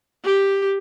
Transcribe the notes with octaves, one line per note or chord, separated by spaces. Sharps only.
G4